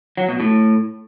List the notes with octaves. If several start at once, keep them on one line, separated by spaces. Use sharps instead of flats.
F#3
B2
A2